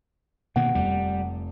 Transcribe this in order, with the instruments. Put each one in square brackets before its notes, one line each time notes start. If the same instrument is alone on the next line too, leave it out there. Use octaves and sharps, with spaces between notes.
[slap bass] B2 D#3 A#3 [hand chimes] F#5
[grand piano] F1 [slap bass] G3